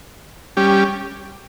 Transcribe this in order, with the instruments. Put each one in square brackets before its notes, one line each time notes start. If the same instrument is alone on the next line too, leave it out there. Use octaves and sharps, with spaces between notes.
[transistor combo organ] G3 C#4 G4